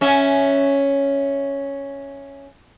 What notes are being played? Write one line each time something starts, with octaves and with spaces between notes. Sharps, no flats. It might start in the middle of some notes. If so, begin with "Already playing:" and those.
C#4 E5